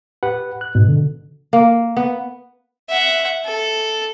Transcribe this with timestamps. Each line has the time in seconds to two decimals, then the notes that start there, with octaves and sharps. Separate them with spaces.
0.23 G4 B4 F#5
0.61 F#6
0.75 G#2 B2
0.88 D3
1.53 A#3
1.97 B3
2.89 E5 F#5
3.45 A4